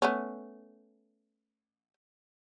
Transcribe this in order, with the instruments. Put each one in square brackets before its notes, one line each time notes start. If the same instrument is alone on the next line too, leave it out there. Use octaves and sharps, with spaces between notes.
[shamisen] A3 B3 C#4